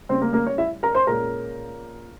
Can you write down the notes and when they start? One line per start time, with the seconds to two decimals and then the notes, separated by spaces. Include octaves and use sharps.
0.09 C#3 G3 A#3 C4 C#4 C5
0.22 A#3 A#4
0.33 A#3 A#4
0.46 C#4 C#5
0.58 E4 E5
0.83 A#4 A#5
0.95 C5 C6
1.07 A#2 G#3 C#4 A#4 A#5